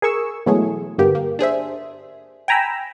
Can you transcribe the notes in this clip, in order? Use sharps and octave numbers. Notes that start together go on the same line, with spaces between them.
G#4 A#4 C#6 E6
B2 E3 F#3 G#3 A3 G#4
G2 D3 A#3 B3 G4
A#3
D4 G#4 C5 E5
G5 G#5 A#5 B5 E6